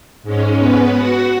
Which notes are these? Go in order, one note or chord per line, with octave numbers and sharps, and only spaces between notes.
G#2 G#3 C#4
B3 B4
F#4 F#5